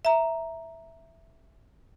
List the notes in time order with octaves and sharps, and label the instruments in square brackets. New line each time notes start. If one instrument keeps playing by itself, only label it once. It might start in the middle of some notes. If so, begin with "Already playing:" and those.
[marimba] E5 A#5